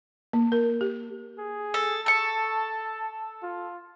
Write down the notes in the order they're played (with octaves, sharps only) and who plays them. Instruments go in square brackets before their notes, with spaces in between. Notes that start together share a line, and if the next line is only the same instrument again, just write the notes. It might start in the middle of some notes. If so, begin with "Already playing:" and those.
[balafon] A#3
A#4
G4
[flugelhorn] G#4
[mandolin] A4
[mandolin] A4 C#6 [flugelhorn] A5
[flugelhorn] F4